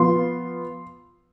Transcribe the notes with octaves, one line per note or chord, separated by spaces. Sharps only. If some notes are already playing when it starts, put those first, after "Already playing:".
Already playing: F3 B3 F4 C6